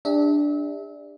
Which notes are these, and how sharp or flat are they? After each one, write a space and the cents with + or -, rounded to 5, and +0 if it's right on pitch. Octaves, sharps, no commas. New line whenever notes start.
D4 +0 G4 +45 E5 -30